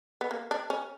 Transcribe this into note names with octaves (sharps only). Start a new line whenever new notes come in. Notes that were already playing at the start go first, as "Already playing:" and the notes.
B3
A#3
D4
C#4